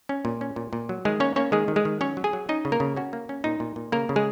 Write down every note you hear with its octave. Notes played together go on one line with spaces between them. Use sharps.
C#4
A#2
C#4
A#2
A#2
F#3
D#3 G#3 G#4
A#3 C#4 C#5
A#3 C#4 C#5
D#3 G#3 G#4
D#3
G#3 G#4
D#3
F#3 C#4 C#5
F#3
G#4 G#5
F#3
C#4 D#4 D#5
C#3
A#3 A#4
C#3
C#4 F#4
A#3
C#4
A#2 D#4
A#2
A#2
C#3 A#3 A#4
C#3
G#3 G#4